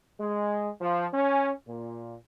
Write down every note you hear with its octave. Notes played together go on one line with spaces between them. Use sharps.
G#3
F3
C#4
A#2